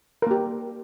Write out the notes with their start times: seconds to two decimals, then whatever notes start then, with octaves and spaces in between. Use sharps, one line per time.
0.22 A#4
0.27 A#3
0.31 G4